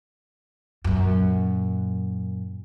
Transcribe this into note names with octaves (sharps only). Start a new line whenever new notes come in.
F#2 A#2